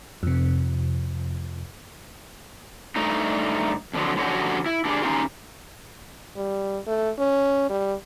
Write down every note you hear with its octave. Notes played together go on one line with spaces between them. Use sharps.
F2 C3
G2 A3 D#4
F2 D3 F3 F#3
D3 F3 F#3 C#4 F#4 G4
E4
D4 G4 G#4
C#4 D#4 F4 G4
G3
A3
C#4
G3